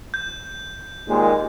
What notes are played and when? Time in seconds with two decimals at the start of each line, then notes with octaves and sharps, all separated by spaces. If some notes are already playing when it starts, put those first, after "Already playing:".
0.14 G6
1.07 D#2 A#2 G#3